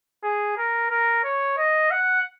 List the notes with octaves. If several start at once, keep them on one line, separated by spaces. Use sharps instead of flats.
G#4
A#4
A#4
C#5
D#5
F#5